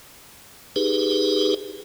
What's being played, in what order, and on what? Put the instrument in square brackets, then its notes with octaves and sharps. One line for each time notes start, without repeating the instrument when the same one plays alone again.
[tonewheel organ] D#4 G4 G#4 B4